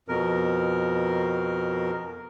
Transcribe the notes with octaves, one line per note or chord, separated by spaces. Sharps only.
F2 B2 A#4